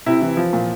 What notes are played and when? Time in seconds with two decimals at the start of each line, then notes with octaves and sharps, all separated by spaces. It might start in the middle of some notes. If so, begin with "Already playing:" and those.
0.06 C3 E4
0.22 E3
0.37 F3
0.53 A#2